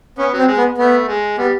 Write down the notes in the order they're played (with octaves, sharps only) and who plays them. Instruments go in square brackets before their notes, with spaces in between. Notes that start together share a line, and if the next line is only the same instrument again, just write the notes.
[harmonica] B3 [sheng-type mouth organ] C#4
[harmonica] F#3 [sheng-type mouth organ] C4
[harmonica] G#3
[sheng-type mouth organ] B3
[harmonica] A3 [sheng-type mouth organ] B3
[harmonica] G#3
[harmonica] G3 [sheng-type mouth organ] B3